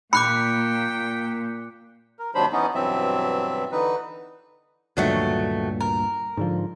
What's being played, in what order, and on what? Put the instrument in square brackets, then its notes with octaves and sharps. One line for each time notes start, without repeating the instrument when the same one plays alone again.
[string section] A#2 [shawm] G5 [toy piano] B5 [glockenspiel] D6 F#6 C#7
[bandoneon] A#4
D#2 C3 F#3 D4 C5 B5
E3 B3 C#4 D#4
G2 B2 E3 F#3 C4 E5
D3 E3 D#4 B4
[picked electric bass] D2 G2 A#2 [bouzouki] D#3 F#3 A3
[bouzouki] A#4
[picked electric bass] G#2 D3 F3